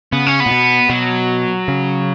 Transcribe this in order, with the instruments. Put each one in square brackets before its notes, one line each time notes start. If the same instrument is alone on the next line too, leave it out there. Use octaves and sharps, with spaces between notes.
[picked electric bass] C#3 [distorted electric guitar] B3
[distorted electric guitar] C#4
B3
[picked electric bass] A#2
B2
[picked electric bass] B2 [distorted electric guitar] F#3
[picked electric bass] C#3